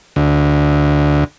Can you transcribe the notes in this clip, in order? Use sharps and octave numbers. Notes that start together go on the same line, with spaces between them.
D2